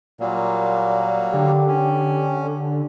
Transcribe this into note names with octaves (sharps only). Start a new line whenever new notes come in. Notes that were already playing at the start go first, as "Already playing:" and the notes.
A#2 F#3 G3 A#3
D3 G4
C#4